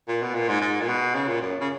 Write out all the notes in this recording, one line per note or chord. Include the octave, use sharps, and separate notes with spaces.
A#2
B2
A#2
G#2
G#2
A#2
B2
C#3
A#2
F#2
C#3